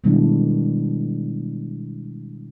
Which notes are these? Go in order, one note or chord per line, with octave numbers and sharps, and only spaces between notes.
B2 D#3 G3 G#3 D4 E4